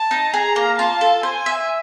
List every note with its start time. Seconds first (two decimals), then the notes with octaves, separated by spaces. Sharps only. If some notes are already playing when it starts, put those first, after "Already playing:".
Already playing: A5
0.11 D#4
0.34 G#4 A#5
0.56 A#3
0.79 F4 A5
1.01 A4
1.23 C5 G#5
1.46 E5